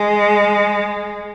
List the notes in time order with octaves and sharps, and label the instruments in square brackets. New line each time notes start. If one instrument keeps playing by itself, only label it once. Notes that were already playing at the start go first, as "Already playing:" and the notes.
Already playing: [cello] G#3